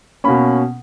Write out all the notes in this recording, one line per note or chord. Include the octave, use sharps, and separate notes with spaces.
B2 A#3 C#4 B5